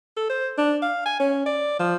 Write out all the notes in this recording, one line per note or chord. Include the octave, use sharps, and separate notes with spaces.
A4
C5
D4
F5
G#5
C#4
D5
F3